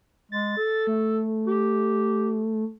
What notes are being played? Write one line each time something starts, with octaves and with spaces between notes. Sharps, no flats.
G#3 A6
A4
A3
G4